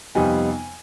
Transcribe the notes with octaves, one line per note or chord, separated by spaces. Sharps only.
F2 C3 G3 B3 D#4 G#5